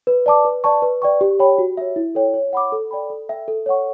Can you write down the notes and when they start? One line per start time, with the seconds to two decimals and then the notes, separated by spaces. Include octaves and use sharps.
0.07 B4
0.26 D5 A5 D6
0.45 B4
0.64 D5 A5 C#6
0.82 B4
1.02 D5 G5 C#6
1.21 G4
1.39 C#5 G5 B5
1.58 F#4
1.77 C#5 E5
1.96 E4
2.15 A4 C#5 G5
2.34 C#5
2.53 F#5 B5 D6
2.72 A4
2.91 D5 G5 B5
3.10 A4
3.29 E5 G5
3.48 A4
3.66 C#5 F#5 C#6